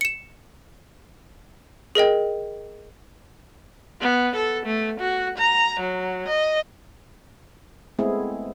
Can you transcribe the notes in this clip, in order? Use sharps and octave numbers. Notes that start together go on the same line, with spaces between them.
C#7 E7
G#4 A#4 D#5 G5
B3
A4
A3
F#4
A#5
F#3
D#5
G#3 A3 B3 C4 E4 G#4